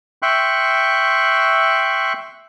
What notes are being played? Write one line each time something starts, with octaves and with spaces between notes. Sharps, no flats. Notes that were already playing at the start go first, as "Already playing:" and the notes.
E5 G5 C6 C#6 F#6